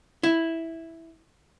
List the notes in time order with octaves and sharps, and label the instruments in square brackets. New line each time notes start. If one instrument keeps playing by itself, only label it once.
[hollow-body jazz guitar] E4